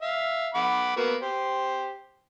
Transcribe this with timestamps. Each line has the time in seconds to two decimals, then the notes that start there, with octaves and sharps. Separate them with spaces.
0.02 E5 F5
0.55 F#5 B5 D6
0.97 A#3 B3 F#4
1.22 G4 C5